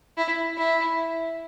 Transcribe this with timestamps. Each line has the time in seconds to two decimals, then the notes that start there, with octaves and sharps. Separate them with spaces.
0.17 E4
0.58 E4